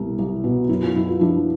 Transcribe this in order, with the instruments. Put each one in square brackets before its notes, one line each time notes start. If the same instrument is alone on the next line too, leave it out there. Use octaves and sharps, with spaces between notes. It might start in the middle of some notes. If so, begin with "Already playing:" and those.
Already playing: [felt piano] C2 B2 E4
C2
B2
F#2 E4
F4
F#2 E4
F4
F3 D4 E4